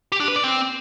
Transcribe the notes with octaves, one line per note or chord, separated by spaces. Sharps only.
G4
D4
B4
D5
C4